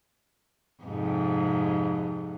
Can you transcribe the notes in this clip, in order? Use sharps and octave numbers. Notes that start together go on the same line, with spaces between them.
F2 G#2 C3